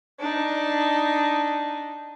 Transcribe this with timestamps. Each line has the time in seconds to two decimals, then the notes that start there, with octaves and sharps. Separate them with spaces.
0.20 D4 D#4